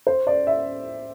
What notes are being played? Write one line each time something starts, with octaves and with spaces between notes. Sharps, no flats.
C5
D5
E5